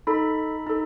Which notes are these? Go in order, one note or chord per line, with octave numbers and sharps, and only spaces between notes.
D#4 A4 B5
D#4 A4